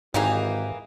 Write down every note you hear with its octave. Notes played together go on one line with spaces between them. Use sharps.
G#1 G#2 E3 A#3 D#4 G4 G#4